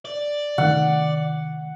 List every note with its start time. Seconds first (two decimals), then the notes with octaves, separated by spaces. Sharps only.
0.05 D5
0.58 C3 D#3 A3 F#5